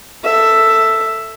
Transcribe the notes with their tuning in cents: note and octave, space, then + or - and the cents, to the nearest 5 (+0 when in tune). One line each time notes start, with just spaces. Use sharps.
A4 +15 E5 +5